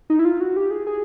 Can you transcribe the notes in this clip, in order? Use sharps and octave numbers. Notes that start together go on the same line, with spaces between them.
D#4
E4
F4
F#4
G4
G#4
G#4